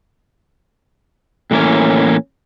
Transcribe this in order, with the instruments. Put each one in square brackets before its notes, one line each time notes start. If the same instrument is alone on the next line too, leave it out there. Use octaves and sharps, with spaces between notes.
[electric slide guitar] A2 E3 A#3 C#4